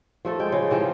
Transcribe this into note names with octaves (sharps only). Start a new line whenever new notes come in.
F3 A3 A4
G#3 G5
C#3
C3 E3 F3 G5